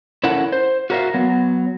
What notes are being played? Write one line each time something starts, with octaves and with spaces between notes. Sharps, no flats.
C#4 E4 A4 A#4 F#5
C5
F#4 G4 A#4 C#5 E5 F5
F#3 B3